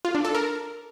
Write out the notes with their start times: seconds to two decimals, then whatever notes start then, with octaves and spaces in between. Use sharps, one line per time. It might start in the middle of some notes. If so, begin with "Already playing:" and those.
0.05 F4
0.15 D4
0.25 A4
0.35 A#4